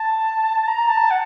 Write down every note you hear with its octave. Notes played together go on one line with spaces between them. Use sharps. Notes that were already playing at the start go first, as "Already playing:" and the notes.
Already playing: A5
A#5
A5
F#5